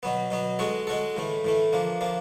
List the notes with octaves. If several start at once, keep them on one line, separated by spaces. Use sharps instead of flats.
B2 F#3 B3
B2 F#3 B3
G#3 C#4 F#4 A4
G#3 C#4 F#4 A4
A2 E3 A3
A2 E3 A3
F3 A#3 D4
F3 A#3 D4